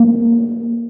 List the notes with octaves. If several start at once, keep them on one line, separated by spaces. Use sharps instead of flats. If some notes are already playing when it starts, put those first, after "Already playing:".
Already playing: A#3